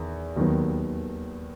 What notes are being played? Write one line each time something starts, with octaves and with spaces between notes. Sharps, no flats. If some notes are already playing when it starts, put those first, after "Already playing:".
Already playing: E2 D#3
D#2 D#3 F#3 B3